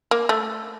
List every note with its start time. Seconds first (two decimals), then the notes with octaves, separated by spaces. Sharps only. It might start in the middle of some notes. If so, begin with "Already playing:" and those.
0.11 A#3
0.29 A3